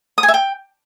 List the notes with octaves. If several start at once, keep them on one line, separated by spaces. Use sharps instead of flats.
D#6
G#5
E5
G5